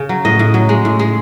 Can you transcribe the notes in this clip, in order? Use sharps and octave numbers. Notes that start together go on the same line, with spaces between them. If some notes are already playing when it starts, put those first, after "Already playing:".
Already playing: C#3
F#3
A2 D#5
A2
F#3
G#3
A2
G#3